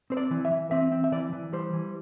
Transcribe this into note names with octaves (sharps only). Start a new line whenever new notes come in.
C4 C5
D5
E3
E5
E3
C4 E5
C4
E5
E3 D5
E3
G3 C5
E3